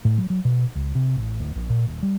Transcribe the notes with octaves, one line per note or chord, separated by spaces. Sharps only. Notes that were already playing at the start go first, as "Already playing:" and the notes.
A2
F#3
F#3
B2
C#2
C3
A1
D1
A#1
A#2
D#1
G3